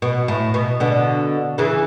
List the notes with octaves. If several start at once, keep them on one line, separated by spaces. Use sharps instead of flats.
B2
A2
B2
B2 D3
C#3 E3